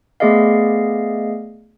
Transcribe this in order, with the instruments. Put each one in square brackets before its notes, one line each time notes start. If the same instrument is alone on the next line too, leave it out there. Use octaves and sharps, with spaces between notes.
[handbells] A3 B3 G#4 D5 D#5 F5